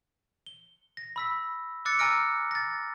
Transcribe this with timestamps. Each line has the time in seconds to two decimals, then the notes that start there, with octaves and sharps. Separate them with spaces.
0.46 G7
0.97 A#6
1.16 B5 E6 B6
1.85 D6 E6 F#6 A6 C#7
1.99 G#5 A#5 E6 F6 A#6 D7
2.51 A6 A#6